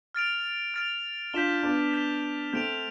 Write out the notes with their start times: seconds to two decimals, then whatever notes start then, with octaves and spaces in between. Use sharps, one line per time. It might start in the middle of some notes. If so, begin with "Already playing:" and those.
0.15 F6 A6 D7 F7
0.74 F6 A6 D7 F7
1.33 D4 F4 G6 B6 E7 G7
1.63 B3 D4
1.93 G6 B6 E7 G7
2.53 A3 C4 G6 D7 F7